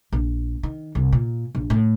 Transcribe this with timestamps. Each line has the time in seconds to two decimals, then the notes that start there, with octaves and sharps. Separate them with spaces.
0.12 A#1
0.63 D#3
0.95 C2
1.12 A#2
1.55 A#1
1.70 A2